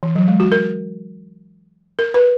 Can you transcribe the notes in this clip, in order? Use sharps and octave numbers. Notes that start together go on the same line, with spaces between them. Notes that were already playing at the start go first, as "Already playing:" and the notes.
E3
F#3
G#3
F#4
A#4
A#4
B4